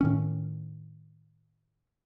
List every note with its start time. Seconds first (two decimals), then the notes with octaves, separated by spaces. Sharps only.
0.01 A2 D#3 C#4